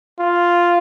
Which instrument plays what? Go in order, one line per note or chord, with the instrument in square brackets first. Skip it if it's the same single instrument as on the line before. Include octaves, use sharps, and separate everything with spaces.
[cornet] F4